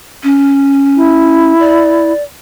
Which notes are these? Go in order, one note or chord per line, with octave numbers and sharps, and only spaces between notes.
C#4
E4
D5